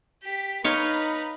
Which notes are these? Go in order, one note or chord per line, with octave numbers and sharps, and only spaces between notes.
G4 B6
D#4 B4 C#5 F5 A#5 C6